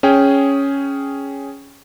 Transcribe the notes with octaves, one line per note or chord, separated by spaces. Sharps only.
C#4 G#4 G5